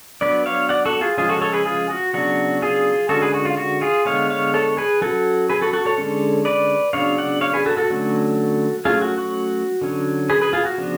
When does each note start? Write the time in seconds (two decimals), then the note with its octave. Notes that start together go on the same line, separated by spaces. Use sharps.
0.21 F#3 B3 D4 B4 D5
0.46 C#5 F5
0.69 D5 F#5
0.85 F#4 A4
1.01 F4 G#4
1.17 C#3 F3 G#3 C#4 F4 G#4
1.29 F#4 A4
1.41 A4 C#5
1.53 G#4 B4
1.65 F4 G#4
1.90 F#4
2.13 C#3 F#3 B3 D4 F#4
2.62 F4 G#4
3.09 D3 G#3 C#4 F#4 A4
3.22 G#4 B4
3.34 F#4
3.45 F4
3.57 F#4
3.81 F4 G#4
4.05 D3 G#3 B3 C#5 F5
4.30 C#5 F5
4.54 A4 C#5
4.77 G#4 B4
5.01 F#3 C#4 F#4 A4
5.50 G#4 B4
5.61 F#4 A4
5.73 F#4 A4
5.85 A4 C#5
5.98 D3 G#3 C#4
6.45 B4 D5
6.93 C#3 F#3 B3 D4 C#5 F5
7.18 D5 F#5
7.41 C#5 F5
7.53 G#4 B4
7.66 F#4 A4
7.77 F#4 A4
7.90 D3 F#3 A3 C#4
8.85 F#3 A3 C#4 F4 G#4
9.02 F#4
9.18 F#4
9.81 D3 F#3 C#4
10.30 G#4 B4
10.41 G#4 B4
10.53 F4 G#4
10.65 F#4
10.78 C#3 F3 B3 D4